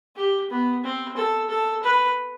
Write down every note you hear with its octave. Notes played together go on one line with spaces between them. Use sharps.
G4
B3
C4
A4
A4
B4